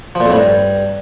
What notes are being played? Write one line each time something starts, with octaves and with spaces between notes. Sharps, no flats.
F3
A#2
F2
A2
G2